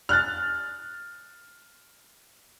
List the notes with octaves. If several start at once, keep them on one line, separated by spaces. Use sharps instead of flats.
F6 F#6 A6